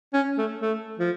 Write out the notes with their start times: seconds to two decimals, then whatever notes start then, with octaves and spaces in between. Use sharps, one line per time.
0.13 C#4
0.38 A3
0.62 A3
0.99 F3